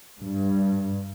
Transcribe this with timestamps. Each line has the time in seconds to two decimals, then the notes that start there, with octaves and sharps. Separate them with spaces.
0.21 G2